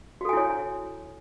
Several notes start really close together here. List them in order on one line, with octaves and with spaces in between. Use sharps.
F#4 A4 G#5 E4 C#5